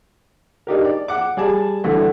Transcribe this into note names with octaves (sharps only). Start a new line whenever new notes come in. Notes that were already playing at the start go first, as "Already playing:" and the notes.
D4 D#4 G4 A#4
D5
F#5 D6
G3 G#4 D5 A5
C2 D3 E3 A3 F#4